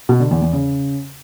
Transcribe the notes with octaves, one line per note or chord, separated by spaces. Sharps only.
B2
D3
E2
E2
C#3